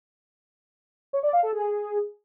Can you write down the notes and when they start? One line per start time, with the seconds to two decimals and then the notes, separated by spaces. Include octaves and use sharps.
1.13 C#5
1.23 D5
1.33 F5
1.43 A4
1.53 G#4